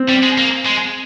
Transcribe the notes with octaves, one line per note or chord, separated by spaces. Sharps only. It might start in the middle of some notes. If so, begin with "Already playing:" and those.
Already playing: C4
G3
G#3
A#3
G#3